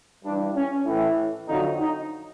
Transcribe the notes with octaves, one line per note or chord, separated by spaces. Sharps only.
G2 E3 D4
C#4
A2 E3
F2 D3 F#3 D#4
D#4